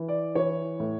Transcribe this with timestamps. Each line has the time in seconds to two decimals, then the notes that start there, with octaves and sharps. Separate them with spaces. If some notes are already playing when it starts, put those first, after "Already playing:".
Already playing: E3
0.08 D5
0.35 E3 C#5
0.80 A2